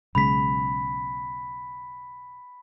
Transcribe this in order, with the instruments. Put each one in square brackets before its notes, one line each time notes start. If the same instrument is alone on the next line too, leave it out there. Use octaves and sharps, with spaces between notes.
[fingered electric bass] B1 C#3 G#3 [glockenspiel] B5 B6